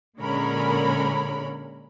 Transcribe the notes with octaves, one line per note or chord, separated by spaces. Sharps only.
A#2 D3 G#3 C#4 A#4 B5